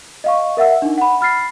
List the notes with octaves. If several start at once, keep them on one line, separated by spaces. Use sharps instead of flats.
D#5 F5 C#6
A#4 E5 F#5 E6
D4 D#4
F#5 B5
B5 F6 A6 C7